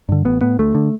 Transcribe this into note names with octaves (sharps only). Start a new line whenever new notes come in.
G2 D3
A1 B3
A2 B3
D2 A3
D3